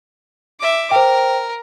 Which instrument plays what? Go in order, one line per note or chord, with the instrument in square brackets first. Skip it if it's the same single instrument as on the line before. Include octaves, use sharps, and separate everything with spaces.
[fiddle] E5 D6
[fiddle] A#4 [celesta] C5 G5